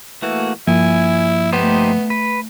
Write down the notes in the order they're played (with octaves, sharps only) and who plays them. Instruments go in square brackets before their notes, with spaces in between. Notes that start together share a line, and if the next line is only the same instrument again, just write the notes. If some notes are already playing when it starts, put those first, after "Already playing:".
[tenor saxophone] E3 [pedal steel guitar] A3 A#3 F#4
[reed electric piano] G2 F3 A#3 [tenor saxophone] E4 [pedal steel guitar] G#5
[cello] A3 [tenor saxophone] B3 [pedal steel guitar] D#4 G4 C5
[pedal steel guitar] B4